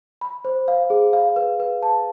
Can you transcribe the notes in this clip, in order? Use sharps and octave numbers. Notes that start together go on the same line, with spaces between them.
B5
C5
F5
G#4
F5
B4
B4
A5